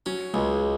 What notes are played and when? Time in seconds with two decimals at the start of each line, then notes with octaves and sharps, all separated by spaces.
0.06 F#3 C#4
0.34 C#2 G#3